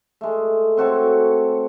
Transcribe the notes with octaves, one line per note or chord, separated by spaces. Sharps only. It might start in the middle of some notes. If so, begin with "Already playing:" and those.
G#3 A3
C4 F#4 A4 C#5